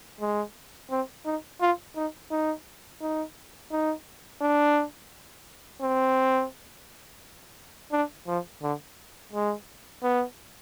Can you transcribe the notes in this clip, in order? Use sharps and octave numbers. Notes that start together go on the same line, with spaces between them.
G#3
C4
D#4
F4
D#4
D#4
D#4
D#4
D4
C4
D4
F3
D3
G#3
B3